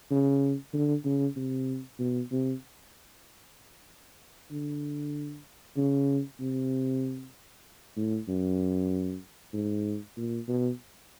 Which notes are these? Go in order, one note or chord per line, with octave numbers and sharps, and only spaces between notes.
C#3
D3
C#3
C3
B2
C3
D3
C#3
C3
A2
F#2
G#2
A#2
B2